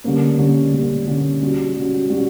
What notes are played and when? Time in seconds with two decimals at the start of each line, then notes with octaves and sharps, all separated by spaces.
0.04 D3 G3 A#3 C#4
0.38 D3 G3 A#3 C#4
0.73 D3 G3 A#3 C#4
1.07 D3 G3 A#3 C#4
1.42 G3 C#4 F#4
1.76 G3 C#4 F#4
2.10 G3 C#4 F#4